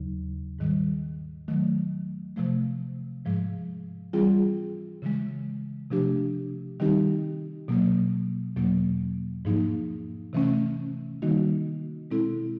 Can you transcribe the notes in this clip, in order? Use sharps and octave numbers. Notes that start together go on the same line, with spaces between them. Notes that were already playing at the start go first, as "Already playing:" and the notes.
Already playing: D#2 C#3 F#3
G#2 D#3 G3
D#3 F#3 A3
C3 F3 A3
G#2 F3 G#3
E3 G3 C4 F4 G#4
C#3 E3 G#3
C3 F3 A3 D4 G4
D#3 G3 C4 D#4 G4
B2 F#3 A#3
E2 B2 F#3 A#3
G#2 F3 A#3 D#4
C3 E3 A3 C#4
D#3 G3 A#3 D#4 F#4
B2 G#3 C4 E4 A4